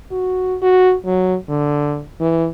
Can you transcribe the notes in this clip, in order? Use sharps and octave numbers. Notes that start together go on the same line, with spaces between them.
F#4
F#4
F#3
D3
E3